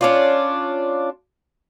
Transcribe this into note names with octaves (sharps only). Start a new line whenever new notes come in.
C#4 D4 F4